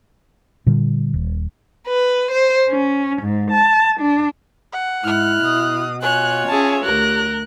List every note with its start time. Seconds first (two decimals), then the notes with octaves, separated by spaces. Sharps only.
0.67 A#2 D3 G3
1.14 D#1
1.86 B4
2.30 C5
2.69 C#4
3.22 G#2
3.51 A5
3.99 D4
4.72 F#5
5.04 G#2 E4 F6 F#6
5.45 B2 D#6
6.02 F4 C#5 G#5 F#6
6.48 C#4 G#4 E5 A5
6.84 D2 G4 A#4 F#6